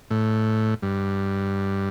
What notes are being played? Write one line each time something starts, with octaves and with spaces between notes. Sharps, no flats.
A2
G2